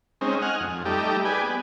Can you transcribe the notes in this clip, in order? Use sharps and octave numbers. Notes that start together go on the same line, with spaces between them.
G#3 C4 C#4 D#4
D#5 F#5 G#5 F6
F2
G3 A3 D#4 G4
G4 G#4 B4 D5 G#5
B3